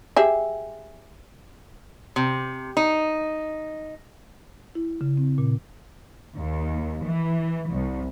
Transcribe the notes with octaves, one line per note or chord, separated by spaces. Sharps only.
G4 G#4 E5
C3
D#4
E4
C#3
C4
A#2
D#2
E3
C2